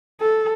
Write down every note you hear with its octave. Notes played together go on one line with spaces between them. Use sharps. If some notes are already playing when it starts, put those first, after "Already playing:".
A4